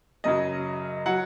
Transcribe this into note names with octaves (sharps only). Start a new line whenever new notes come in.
F#2 C#3 F#3 D#5
F#3 F#5